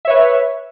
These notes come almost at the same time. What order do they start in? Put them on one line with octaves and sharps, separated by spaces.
E5 C#5 B4